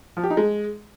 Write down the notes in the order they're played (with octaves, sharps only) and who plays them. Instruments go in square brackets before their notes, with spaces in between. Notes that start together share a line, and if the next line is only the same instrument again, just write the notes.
[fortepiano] F3
G4
D#4
G#3